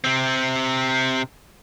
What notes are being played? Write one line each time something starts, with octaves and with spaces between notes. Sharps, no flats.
C3 C4